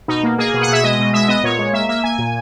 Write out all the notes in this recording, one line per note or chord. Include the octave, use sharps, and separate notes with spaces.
B2 D#4
A#3
A#3 G#4
B2
F#5
B2 E5
G#3 D#5
B2
G#3 E5
B3 D#5
A#2 C#5
G#3
A#3 E5
A#3 E5
A#3 G#5
A#2